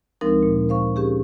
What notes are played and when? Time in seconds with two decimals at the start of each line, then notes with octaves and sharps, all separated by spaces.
0.21 D2 F3 G#3 C4 D#4 A#4
0.43 A#2
0.69 C5 F5 C#6
0.96 C#4 G4 G#4